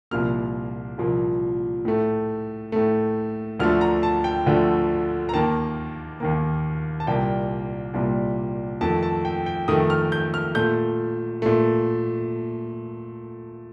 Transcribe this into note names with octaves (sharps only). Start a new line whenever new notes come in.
C2 A#2 F3 A#3 F6
C2 A#2 F3 A#3
A2 A3
A2 A3
D2 D3 F3 A3 F6
A#5
A5
G5
D2 D3 F3 A3
A#5
D#2 D#3 A#3 A5
D#2 D#3 A#3
A5
C2 A#2 G3 A#3 G5
C2 A#2 G3 A#3
F2 D#3 A3 A5
A5
G5
G5
F2 D#3 A3 D#6
F6
G6
F6
A#2 A3 G6
A#2 A3